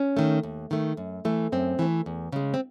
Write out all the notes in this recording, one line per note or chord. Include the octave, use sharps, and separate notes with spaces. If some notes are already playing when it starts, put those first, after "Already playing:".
Already playing: C#4
D#3 A3
D#2
D#3 A3
F#2
E3 A3
F#2 C4
E3 A3
E2
C#3 G#3
C4